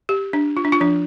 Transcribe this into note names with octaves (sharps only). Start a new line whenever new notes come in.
G4
D4
F4
D4
F4
F3 D4